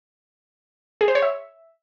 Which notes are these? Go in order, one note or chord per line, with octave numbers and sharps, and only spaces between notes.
G#4
C5
C#5
E5